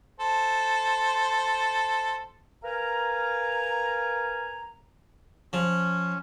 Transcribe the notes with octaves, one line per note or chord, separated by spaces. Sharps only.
A4 C5
A#4 B4 F5 G#5 A#5
F3 C#4